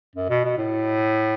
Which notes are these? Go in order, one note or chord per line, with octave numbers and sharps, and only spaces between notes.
F#2
B2
B2
A2